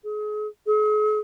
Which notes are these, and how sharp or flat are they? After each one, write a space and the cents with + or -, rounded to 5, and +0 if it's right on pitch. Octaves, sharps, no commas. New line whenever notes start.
G#4 +35
G#4 +45